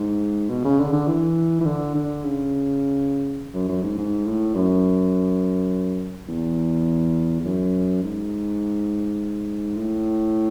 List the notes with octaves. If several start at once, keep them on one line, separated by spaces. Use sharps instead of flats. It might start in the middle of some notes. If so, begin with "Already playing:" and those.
Already playing: G#2
B2
C#3
D3
D3
E3
E3
D3
D3
C#3
F#2
F#2
G#2
G#2
A2
F#2
E2
E2
F#2
G#2
A2